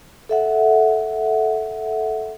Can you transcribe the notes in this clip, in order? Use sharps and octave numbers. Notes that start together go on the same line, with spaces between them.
A4 E5 F#5